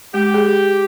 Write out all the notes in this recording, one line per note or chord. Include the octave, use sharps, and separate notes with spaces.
G#3 G4
G#4